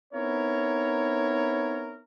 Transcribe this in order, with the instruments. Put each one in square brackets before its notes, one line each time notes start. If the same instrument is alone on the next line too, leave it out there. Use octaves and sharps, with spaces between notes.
[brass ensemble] B3 C4 D#4 E4 A#4 C#5